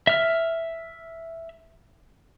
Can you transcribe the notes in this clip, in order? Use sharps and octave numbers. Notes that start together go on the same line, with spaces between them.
E5 F6